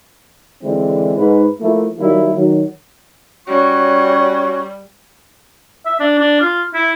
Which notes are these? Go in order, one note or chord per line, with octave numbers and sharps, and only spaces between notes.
D3 E3 G#3 C4 D4 E4
G#2 B4
F3 A3 A#3 E4
D#3 F#3 G3 A#3 E4
D#3 F#3
G3 C#4 F#4 C#5 C#6
E5
D4
D4
F4
E4